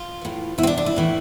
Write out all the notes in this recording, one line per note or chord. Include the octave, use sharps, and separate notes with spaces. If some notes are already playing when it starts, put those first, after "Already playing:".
Already playing: F4
A2 E3
B2 E4
C4
D4
D4
E4
A2 E3